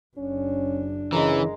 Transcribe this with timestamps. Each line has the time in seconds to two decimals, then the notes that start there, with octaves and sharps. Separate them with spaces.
0.18 F#1 C#4 D4
1.12 C#3 E3 G#3 A#4